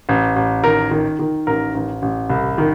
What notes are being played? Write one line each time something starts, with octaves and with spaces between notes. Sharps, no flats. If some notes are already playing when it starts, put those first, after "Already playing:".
A1
A1
D#3 A#4
D#3
D#3
A1 A#4
A1
A1
C2
D#3